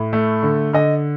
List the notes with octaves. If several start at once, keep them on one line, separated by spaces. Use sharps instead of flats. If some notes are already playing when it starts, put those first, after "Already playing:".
Already playing: A2
A3
D3
D3 D#5